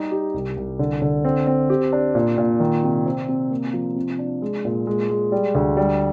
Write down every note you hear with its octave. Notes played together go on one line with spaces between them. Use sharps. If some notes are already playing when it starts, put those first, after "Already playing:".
Already playing: G3 D#4
G4
C2
C2
D3
D3
C4
C4
G4
D4
A#2
A#2
D#3
C3
C4
C3
A#3
F3
C3
D4
G#3
A#2
G#3
G#3
G3
D2
G3